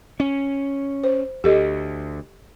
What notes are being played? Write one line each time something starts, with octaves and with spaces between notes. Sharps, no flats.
C#4
C5
D2 G4 A4 D#5